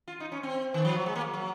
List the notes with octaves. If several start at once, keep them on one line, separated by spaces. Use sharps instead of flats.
F4
D#4
C#4
C4
D#3
F3
F#3
G#3
A#3
F#3